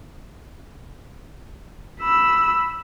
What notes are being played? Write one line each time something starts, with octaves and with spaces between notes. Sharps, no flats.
B5 E6